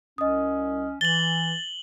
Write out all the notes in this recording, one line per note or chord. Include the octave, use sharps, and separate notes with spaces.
C2 C#4 D#5 D#6
E3 A6 F#7 G7